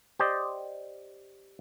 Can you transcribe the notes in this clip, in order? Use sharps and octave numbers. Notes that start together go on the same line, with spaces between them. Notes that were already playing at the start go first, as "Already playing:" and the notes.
G4 C5 D5 D#5